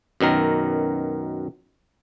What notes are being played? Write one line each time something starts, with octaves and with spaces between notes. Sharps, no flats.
F#2 B2 D#3 A#4